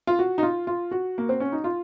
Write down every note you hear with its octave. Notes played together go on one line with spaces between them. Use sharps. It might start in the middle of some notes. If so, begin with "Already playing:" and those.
F4
F#4
D#4
F4
F4
F#4
A#3
C4
C#4
D#4
F4